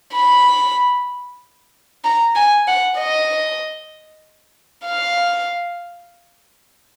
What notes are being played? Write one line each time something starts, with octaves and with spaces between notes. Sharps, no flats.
B5
A#5
G#5
F#5
D#5
F5